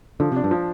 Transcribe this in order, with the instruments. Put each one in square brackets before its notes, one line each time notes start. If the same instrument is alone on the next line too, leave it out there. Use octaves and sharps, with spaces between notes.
[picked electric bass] D3 [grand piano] F3
[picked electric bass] C3
[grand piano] D4
[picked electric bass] G2
[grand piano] F3